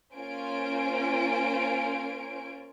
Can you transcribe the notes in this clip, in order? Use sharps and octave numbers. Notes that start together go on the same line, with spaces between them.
A#3 C#4 F4 C5 G#5 D7